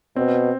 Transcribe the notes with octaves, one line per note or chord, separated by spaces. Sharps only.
B2 C4